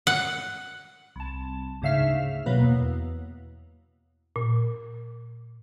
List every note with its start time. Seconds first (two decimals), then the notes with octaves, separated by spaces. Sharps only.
0.07 F#5
1.16 C2 A5
1.82 D2 G#2 C#3 E5 F5 F6
2.46 B2 F#3 A#3 B4
2.63 E2
4.36 A#2